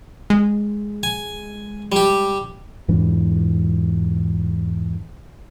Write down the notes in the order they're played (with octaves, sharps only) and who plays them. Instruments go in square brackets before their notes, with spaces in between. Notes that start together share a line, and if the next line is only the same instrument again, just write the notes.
[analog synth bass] G#3
[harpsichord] G#5
G3 G4
[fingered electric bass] E2 G#2 E3 D4